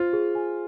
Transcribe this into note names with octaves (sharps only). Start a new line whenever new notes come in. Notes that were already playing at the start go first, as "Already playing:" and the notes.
Already playing: F4 C5
G#4
G#5